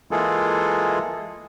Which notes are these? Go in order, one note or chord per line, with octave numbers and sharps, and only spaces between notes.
E3 G#3 A#3 F4 G#4 A4